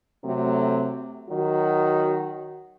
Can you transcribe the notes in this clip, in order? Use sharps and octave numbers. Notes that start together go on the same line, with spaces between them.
C3 F#3 A3
D#3 F#3 F#4